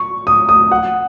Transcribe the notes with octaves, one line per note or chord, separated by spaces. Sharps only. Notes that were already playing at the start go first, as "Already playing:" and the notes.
Already playing: C#6
D#6
D#6
F#5